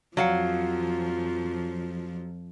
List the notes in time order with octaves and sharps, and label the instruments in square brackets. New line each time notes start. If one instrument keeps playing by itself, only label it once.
[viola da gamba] F2 F3 [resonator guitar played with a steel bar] F#3 F5 F#5